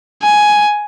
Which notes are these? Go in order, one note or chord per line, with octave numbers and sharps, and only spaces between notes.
G#5